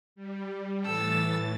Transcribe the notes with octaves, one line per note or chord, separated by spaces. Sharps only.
G3
A2 E3 A4 E6 A6